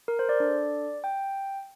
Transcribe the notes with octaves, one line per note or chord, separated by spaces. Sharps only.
A#4
C5
D5
D4 A4
G5